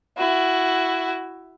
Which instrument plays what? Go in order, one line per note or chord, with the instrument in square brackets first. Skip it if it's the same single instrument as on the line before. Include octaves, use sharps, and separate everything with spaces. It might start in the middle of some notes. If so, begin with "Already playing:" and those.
[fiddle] E4 F#4